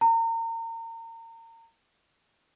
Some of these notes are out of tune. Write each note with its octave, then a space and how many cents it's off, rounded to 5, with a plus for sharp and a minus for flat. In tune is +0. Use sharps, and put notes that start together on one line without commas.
A#5 -35